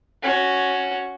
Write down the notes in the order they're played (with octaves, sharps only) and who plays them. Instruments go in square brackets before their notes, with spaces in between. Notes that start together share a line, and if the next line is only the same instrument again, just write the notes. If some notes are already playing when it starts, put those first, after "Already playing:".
[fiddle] C#4 F#4